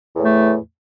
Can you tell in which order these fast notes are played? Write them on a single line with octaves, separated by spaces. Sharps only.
E2 A2 A3